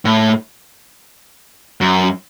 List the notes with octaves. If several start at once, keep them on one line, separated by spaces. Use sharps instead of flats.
A2
F#2